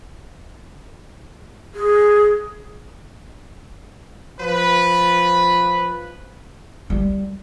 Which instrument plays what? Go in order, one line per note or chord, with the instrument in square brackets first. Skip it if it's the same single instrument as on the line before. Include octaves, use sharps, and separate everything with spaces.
[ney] G#4
[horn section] F3 B4
[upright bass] G3